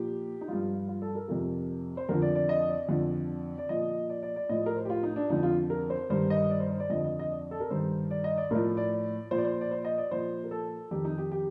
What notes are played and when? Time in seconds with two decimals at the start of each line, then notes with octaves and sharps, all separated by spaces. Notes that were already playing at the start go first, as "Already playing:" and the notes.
Already playing: A#2 F3 G4
0.41 D#4
0.48 G2 F3 F4
0.88 F4
1.02 A4
1.15 A#4
1.28 F2 C3 F3 A#4
1.97 C5
2.09 F2 D3 F3 A#4
2.22 D5
2.35 D5
2.49 D#5
2.69 D5
2.89 F2 D3 F3
3.58 D5
3.69 A#2 F3 D#5
4.10 D5
4.23 D5
4.36 D5
4.49 A2 F3 D#5
4.66 A#4
4.76 C5
4.85 G4
4.90 F4
5.03 D#4
5.16 D4
5.30 F2 D3 F3 D#4
5.43 F4
5.70 A#4
5.90 C5
6.10 G2 D#3 C5
6.30 D#5
6.50 D5
6.60 C5
6.71 C5
6.80 D5
6.90 F2 D3 F3 D#5
7.04 D#5
7.19 D#5
7.31 D5
7.51 A4
7.60 A#4
7.70 G2 D#3 C5
8.11 D5
8.24 D#5
8.38 D5
8.51 A2 F3 A#4
8.77 D5
9.31 A#2 F3 C5
9.38 D5
9.45 C5
9.61 D5
9.71 C5
9.85 D#5
9.98 D5
10.11 A#2 F3 C5
10.44 A#4
10.51 A4
10.91 F2 D#3 G4
11.05 D#4
11.18 G4
11.32 G4